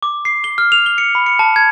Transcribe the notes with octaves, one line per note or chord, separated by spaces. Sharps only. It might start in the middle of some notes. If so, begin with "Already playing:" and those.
D6
C7
G7
F6
F7
G7
C#7
B5
C#7
A5
G#6